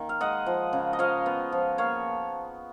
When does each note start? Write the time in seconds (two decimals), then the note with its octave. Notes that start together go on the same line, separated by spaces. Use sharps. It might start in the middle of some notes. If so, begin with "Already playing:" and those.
Already playing: D#3 A#3
0.09 F5
0.21 G#3 D#5 F#5
0.46 F3
0.73 C#3
0.93 D#5
0.99 F3 C#5 F5
1.26 B3
1.52 F3
1.78 A#3 C#5 F5